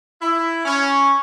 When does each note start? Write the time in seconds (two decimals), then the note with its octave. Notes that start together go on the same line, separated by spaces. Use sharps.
0.22 E4
0.66 C#4